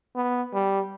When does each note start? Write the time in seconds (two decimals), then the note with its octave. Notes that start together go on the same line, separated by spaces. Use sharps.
0.15 B3
0.54 G3